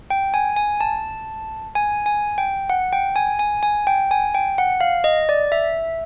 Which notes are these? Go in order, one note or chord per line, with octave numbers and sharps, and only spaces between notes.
G5
G#5
G#5
A5
G#5
G#5
G5
F#5
G5
G#5
G#5
G#5
G5
G#5
G5
F#5
F5
D#5
D5
E5